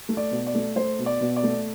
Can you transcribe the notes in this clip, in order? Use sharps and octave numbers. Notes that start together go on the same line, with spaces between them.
A3
D5
B2
D5
A3
A3 C5
B2
D5
B2
D5
A3